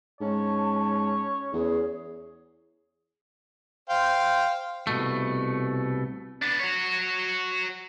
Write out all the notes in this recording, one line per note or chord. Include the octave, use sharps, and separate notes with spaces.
G#2 C#4 C#5 A5
E2 G#4
C5 F5 G5
C2 B2 A3
B3 D4
F#4 C#5